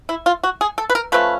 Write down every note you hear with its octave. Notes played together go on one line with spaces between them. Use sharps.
E4
F4
F#4
G#4
A4
B4
A#4
F3 A3 C#4 B4